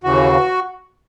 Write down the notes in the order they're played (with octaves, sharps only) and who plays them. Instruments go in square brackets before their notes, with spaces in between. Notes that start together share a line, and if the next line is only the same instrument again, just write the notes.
[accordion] D#2 C#3 E3 F#4